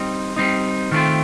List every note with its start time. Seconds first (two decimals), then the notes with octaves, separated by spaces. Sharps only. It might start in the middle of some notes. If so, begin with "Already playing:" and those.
Already playing: G3 C4 D#4
0.36 G3 C4 D#4
0.92 D#3 A3 C4 F4